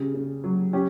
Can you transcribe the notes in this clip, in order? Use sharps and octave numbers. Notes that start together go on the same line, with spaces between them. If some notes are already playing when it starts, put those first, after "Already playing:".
Already playing: C#3 G3
C#3
F#3
C#4 G4